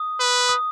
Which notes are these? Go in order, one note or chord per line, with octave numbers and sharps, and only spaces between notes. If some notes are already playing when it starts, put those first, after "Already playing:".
Already playing: D#6
B4
D#6